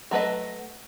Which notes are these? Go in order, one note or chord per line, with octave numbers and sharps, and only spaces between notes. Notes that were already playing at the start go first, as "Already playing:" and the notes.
F#3 A3 B4 D#5